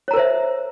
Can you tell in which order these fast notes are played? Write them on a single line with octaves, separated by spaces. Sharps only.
C#5 A#5 A#4 C5 E5